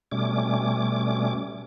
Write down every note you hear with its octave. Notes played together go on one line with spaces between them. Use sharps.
B2 G3 A3 C#4 D6